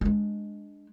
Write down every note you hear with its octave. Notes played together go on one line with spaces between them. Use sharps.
G#3 D4